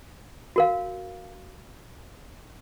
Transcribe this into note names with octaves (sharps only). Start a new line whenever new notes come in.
F#4 A#4 F5